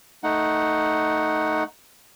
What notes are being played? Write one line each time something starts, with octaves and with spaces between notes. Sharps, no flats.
A3 D#4 F#5